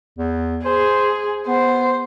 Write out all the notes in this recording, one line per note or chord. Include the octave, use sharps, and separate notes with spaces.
E2
G#4 C5
B3 C5